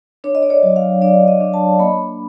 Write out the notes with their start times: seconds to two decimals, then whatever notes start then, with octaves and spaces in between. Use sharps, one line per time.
0.24 D4 C#5
0.35 D#5
0.43 D5
0.50 C#5
0.63 F#3
0.76 F5
1.02 D4 D5
1.28 D#5
1.41 D4
1.54 A5
1.79 A#3 B5